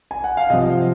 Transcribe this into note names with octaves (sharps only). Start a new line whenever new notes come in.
G#5
F#5
F5
C3 F3 D#5